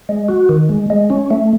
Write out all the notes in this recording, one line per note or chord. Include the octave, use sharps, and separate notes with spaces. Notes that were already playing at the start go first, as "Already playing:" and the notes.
G#3
F#4
D#3
G#3
G#3
C#4
A3